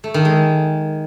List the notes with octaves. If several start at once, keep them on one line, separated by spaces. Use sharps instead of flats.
A3
D#3
G#3